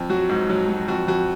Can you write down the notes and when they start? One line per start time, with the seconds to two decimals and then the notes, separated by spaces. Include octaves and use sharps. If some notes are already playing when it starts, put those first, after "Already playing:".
Already playing: F2
0.09 F#3 F#4
0.29 G#2
0.49 F#3
0.69 F#3
0.88 F2 F#4
1.08 F2 F#4